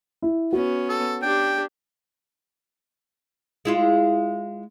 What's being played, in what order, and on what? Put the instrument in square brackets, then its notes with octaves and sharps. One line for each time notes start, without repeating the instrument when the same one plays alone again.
[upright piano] E4
[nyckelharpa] B3 C#4 [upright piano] F#4
[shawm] A4
[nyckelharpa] D4 G4 [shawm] G5
[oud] G#3 E4 F4